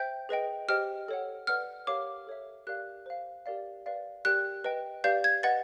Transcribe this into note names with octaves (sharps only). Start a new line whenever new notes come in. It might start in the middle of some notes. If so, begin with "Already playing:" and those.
Already playing: C5 E5 G5 G6
G#4 B4 D#5 G5
G4 C5 D#5 G5 F6
A4 C#5 F#5
B4 D5 F#5 F6
G4 A#4 C#5 F5 D6
A4 C#5 E5
G4 A#4 D5 F5 F#6
C5 F5
G4 A#4 D5 F5
B4 D5 F5
G4 A#4 D5 G5 F#6
B4 D#5 G5
G4 B4 D5 F5 G6
G#6
B4 D#5 F#5 A6